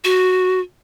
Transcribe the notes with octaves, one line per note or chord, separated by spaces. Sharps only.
F#4